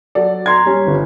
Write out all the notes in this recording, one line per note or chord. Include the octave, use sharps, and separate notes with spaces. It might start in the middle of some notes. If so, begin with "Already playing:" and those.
F#3 A4 D5
A#5 C6 G#6
G3 C#4
G1